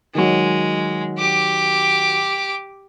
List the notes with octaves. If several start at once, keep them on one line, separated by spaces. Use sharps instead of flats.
D#3 F#3 G#3
G4 D6